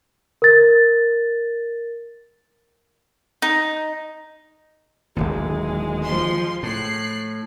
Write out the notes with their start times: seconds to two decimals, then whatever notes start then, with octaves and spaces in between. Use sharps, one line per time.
0.42 A#4 A6
3.42 D#4
5.17 D1 G#1 D#2 G#3
6.03 F3 C6
6.63 A2 F#6 C7